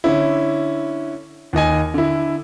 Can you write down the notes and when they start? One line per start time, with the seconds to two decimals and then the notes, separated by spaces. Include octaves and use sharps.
0.04 D3 C#4 E4
1.53 D#2 D#3 D#5 G#5
1.94 D3 E4